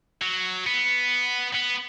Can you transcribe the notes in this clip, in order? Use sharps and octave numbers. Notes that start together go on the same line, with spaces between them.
F#3
B3
B3